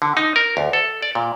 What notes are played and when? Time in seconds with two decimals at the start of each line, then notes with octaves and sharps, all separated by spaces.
0.02 D3
0.17 D#4
0.36 A#4
0.57 D2
0.73 A4
1.02 D5
1.15 A#2